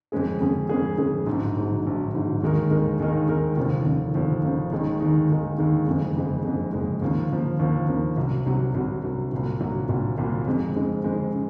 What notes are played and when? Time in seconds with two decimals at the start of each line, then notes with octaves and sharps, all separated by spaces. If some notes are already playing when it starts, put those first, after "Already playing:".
0.12 F2 C#3 G#3 C#4 G#4
0.41 F2 C#3 G#3 C#4 G#4
0.69 F2 C#3 G#3 C#4 G#4
0.98 F2 C#3 G#3 C#4 G#4
1.26 A#1 G#2 F#3
1.56 A#1 G#2 F#3
1.85 A#1 G#2 F#3
2.14 A#1 G#2 F#3
2.42 D#2 D#3 G#3 D#4 A#4
2.71 D#2 D#3 G#3 D#4 A#4
2.99 D#2 D#3 G#3 D#4 A#4
3.28 D#2 D#3 G#3 D#4 A#4
3.57 F1 D#2 C#3 F3
3.86 F1 D#2 C#3 F3
4.14 F1 D#2 C#3 F3
4.43 F1 D#2 C#3 F3
4.72 D#2 D#3 G#3 D#4
5.01 D#2 D#3 G#3 D#4
5.29 D#2 D#3 G#3 D#4
5.58 D#2 D#3 G#3 D#4
5.87 F#1 F2 C#3 G#3
6.16 F#1 F2 C#3 G#3
6.45 F#1 F2 C#3 G#3
6.73 F#1 F2 C#3 G#3
7.02 D#2 C#3 F3 A#3
7.30 D#2 C#3 F3 A#3
7.59 D#2 C#3 F3 A#3
7.88 D#2 C#3 F3 A#3
8.17 C2 C3 F#3
8.46 C2 C3 F#3
8.74 C2 C3 F#3
9.03 C2 C3 F#3
9.32 C2 A#2 F#3
9.60 C2 A#2 F#3
9.89 C2 A#2 F#3
10.18 C2 A#2 F#3
10.47 F2 C#3 G#3 C4
10.76 F2 C#3 G#3 C4
11.04 F2 C#3 G#3 C4
11.34 C#3